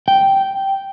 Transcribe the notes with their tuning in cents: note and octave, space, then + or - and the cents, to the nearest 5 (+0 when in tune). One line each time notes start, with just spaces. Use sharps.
G5 -5